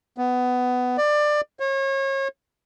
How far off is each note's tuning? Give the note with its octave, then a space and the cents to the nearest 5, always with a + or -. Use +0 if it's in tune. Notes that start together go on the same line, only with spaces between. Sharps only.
B3 +15
D5 +20
C#5 -35